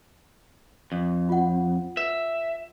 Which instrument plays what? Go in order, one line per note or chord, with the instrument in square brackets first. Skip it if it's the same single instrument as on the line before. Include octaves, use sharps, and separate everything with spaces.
[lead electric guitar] F2
[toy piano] F4 F#5
[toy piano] B4 [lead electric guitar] E5